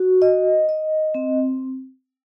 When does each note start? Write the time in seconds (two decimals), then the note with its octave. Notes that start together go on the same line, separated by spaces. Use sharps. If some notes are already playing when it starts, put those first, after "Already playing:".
Already playing: F#4
0.22 D#5
0.69 D#5
1.14 C4